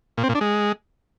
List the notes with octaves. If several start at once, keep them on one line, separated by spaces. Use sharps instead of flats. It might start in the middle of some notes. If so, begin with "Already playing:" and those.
A#2
C4
A#2
D4
G#3